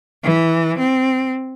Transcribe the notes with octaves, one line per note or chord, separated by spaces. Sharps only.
E3
C4